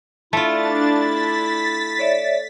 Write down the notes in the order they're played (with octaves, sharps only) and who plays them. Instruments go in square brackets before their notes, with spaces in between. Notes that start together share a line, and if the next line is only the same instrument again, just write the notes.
[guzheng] A3 F4 [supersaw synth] D4 A6 [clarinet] E4
[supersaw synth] A6 B6
[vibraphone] C#5 D5 E5